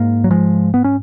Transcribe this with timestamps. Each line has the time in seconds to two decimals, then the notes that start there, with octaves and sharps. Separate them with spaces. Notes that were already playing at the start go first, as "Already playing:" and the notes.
Already playing: G#2 A#3
0.24 F#3
0.31 F3 G#3
0.74 B3
0.84 C#4